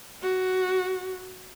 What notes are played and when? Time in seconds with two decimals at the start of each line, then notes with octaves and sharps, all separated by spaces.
0.22 F#4